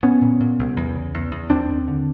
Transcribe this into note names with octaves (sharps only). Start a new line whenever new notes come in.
A#2 B3 C#4
A#2
A#2
C2
E2
C#3
E2
E2
D#2 C4 D4
D#2
D3